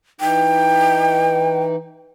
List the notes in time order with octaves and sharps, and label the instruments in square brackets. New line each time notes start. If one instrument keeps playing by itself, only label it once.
[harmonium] E3 D#4 [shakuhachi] G5